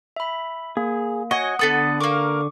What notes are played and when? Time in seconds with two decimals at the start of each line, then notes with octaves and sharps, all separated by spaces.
0.16 E5 B5
0.77 A#3 G#4
1.31 F#4 C#5 D#5 F#5 G#5
1.59 D3 B3 A4 B4 D#6
2.00 A#3 A#4 C#6 D6